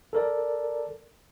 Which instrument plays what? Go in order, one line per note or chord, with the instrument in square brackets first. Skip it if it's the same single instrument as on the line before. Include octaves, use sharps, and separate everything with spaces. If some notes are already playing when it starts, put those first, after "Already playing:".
[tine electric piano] A4 A#4 D5